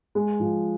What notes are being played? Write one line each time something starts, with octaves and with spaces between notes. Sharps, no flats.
G#3
F3